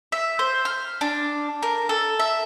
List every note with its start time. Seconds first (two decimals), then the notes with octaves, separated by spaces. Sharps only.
0.12 E5
0.39 C5
0.65 F6
1.01 D4
1.63 A#4
1.89 A4
2.19 E5